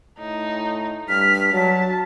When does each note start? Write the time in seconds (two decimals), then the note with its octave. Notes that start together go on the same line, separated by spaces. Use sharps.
0.19 A2 D#4
1.09 G2 F6 B6
1.53 F#3 A5